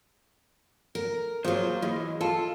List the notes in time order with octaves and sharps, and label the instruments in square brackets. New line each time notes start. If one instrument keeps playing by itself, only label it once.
[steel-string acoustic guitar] A#4
[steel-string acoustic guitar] F#3 F4 [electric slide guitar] A#3 G#4 C5
[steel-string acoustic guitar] E3 [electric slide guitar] E4 G#4 D#5
[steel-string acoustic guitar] F4 [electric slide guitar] A4 A5